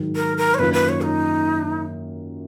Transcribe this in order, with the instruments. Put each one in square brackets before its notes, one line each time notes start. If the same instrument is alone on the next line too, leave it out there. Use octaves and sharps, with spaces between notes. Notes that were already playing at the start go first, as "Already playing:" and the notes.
Already playing: [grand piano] G#2 D#3 F#3
[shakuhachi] A#4
A#4
C#5
[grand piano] F#2 D#3 A#3 F4 [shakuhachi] B4
[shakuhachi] B4
C#5
D#4